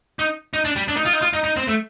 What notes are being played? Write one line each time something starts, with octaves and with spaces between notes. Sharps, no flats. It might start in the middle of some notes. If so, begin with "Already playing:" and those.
D#4
D#4
D4
G3
D4
D#4
F4
D#4
F4
D#4
D#4
C4
A3